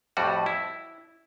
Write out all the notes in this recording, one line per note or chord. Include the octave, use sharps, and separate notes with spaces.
F2 A2 G3 F#4
E4